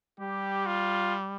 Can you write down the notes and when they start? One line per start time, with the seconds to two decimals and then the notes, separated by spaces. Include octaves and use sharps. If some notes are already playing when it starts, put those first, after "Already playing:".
0.20 G3 G4
0.66 F4